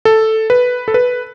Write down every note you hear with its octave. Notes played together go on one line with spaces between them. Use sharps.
A4
B4
A4
B4